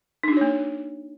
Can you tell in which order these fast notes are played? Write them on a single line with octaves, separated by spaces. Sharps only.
D#4 D4 F#4 C#5 A#3